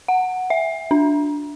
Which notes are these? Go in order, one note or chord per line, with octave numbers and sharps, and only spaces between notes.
F#5
E5
D4